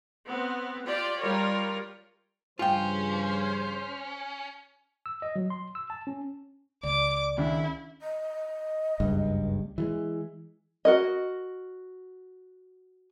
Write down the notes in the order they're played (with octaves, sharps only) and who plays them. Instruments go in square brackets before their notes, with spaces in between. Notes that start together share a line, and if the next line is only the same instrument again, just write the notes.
[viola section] B3 C4
F4 G4 D5
G3 F4 A#4 C#5
[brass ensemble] G2 C#3 F3 [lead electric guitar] C#4 [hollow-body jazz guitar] F4 G5 [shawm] C5
[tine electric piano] E6
D#5
F#3
C6
E6
A5
C#4
[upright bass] C#2 [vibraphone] D5 [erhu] D6
[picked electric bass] D#3 C#4 D4 [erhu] E4
[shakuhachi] D#5
[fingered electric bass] F#1 C#2 G2
E3 G3 G#3
[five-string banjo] F#4 A#4 D#5